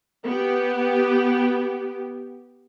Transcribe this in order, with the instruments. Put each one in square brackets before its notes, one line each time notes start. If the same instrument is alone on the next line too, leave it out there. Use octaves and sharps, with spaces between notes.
[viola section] B3 G4